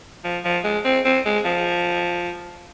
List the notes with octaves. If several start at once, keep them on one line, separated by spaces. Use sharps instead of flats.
F3
F3
G#3
C4
C4
G#3
F3